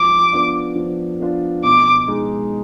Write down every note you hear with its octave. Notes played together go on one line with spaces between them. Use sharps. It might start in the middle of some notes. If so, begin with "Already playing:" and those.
Already playing: F3 D6
B3 D4 F4
F3
B3 D4 F4
B2 D6
G#3 D#4